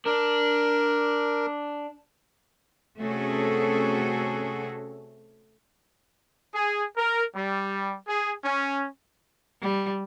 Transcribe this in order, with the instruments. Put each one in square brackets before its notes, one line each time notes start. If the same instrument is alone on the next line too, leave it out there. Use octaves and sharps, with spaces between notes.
[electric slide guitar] D4 [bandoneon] A#4
[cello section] C3 A3 C#4 F#4 G#4 A4
[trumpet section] G#4
A#4
G3
G#4
C#4
[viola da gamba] G3